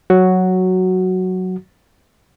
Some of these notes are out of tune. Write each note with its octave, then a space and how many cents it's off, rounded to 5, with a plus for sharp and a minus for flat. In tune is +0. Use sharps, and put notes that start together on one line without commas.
F#3 +0 F#4 +0